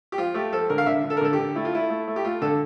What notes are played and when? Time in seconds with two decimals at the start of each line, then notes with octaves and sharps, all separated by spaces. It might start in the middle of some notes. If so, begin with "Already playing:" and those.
0.12 G4
0.18 F3 F4
0.34 A3 G4
0.53 F3 A4
0.70 D3 A#4
0.78 F5
0.86 D3 E5
1.04 D3
1.10 A4
1.17 A#4
1.21 D3 A4
1.33 G4
1.39 D3
1.55 A3 E4
1.65 F4
1.73 A3 E4
1.90 A3
2.07 A3
2.16 G4
2.25 A3 F4
2.42 D3 A4